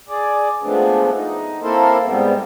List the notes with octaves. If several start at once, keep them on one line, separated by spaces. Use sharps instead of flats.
G#4 D5
F3 G#3 A3 B3 C4 D4
D#4
A#3 C4 E4 A4 A#4 C5
G#2 G3 B3 C4